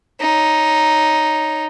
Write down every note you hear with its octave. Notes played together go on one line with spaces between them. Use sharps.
D#4 C#5